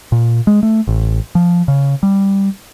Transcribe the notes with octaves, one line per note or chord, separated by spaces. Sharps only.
A#2
G#3
A3
A1
F3
C#3
G3